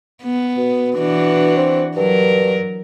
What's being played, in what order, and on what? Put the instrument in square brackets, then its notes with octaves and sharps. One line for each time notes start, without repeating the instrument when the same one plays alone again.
[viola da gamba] B3
[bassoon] B2
[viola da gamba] E3 D4 F#4
[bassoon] C4
[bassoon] G2 [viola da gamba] F#3 A#4